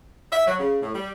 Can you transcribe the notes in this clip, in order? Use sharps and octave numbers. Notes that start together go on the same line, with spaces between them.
E5
F#3
C#3
A2
G3